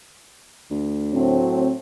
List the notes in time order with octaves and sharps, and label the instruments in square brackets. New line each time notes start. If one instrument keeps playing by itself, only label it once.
[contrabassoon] D2
[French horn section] A2 F#3 C4